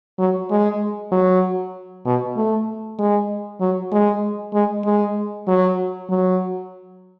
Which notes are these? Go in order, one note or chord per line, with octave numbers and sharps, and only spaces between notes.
F#3
G#3
F#3
B2
A3
G#3
F#3
G#3
G#3
G#3
F#3
F#3